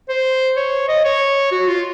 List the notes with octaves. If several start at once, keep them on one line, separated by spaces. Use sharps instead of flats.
C5
C#5
D#5
C#5
F#4
F4